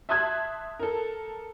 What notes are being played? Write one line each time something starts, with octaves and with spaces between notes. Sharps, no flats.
E5 A5 C6 D#6 F#6 G#6
A4 A#4